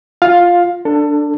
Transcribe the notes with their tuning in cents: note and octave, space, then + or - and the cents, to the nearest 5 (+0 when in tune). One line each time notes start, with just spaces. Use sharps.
F4 +0 F5 +10
D4 +0 A4 +25